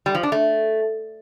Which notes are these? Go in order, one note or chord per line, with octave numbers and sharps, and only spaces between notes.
G3
F3
D4
A3